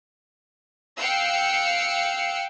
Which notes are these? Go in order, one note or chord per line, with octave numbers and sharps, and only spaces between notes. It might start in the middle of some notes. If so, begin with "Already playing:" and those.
F5 G5 E6 F#6 C7 C#7